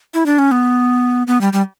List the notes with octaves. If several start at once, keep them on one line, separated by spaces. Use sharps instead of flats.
E4
D4
C#4
B3
B3
G3
G3